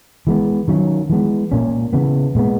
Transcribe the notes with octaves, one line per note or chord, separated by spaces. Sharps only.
E3 G#3 B3
D#3 F#3 C#4
E3 G#3 B3
A#2 A#3 C#4
C#3 E3 B3
A#2 G#3 B3